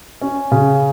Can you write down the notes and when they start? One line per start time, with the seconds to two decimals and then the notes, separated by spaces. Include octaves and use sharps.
0.22 C#4
0.52 C#3